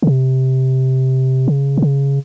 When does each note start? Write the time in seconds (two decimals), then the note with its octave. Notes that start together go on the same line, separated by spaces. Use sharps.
0.02 C#3
0.07 C3
1.48 C#3
1.77 C3
1.82 C#3